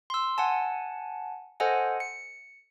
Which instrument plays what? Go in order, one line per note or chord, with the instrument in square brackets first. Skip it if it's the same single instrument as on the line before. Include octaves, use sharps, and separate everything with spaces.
[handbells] C6 E6
F#5 G#5 A5
A4 C5 D#5 F#5 G#5
C#7